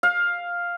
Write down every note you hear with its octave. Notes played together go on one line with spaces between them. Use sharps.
F5